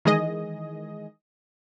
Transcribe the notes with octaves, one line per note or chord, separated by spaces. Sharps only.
D#3 E3 G#3 G#4 D#5